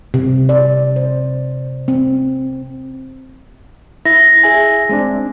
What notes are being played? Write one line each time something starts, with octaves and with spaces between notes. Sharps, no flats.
C3
D5
C5
C4
E4 A#6
G#4 E5 G#5
G#3 C4 D4